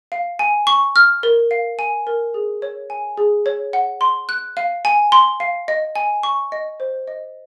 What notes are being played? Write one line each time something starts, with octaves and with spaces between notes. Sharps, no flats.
F5
G#5
C#6
F6
A#4
F5
G#5
A#4
G#4
C#5
G#5
G#4
C#5
F#5
C6
F#6
F5
G#5
C6
F5
D#5
G#5
C#6
D#5
C5
D#5